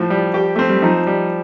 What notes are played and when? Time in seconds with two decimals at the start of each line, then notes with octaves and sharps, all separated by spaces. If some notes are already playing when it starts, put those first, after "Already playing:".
Already playing: A2 F3
0.10 G3
0.34 G4
0.56 A3 C4
0.69 G3
0.82 F3 D#4
1.07 G3